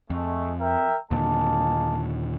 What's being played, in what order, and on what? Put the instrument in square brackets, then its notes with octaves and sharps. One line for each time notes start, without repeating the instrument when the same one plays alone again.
[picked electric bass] F2 [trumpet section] G#3 A3
[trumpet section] A#4 E5 G5
[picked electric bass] D#2 A#2 D3 [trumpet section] G#3 A#3 A5